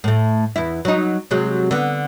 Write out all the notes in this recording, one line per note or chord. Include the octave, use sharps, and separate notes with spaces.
A2 A3
E2 E4
F#3 D#4
C3 F#3 G#3
D3 B3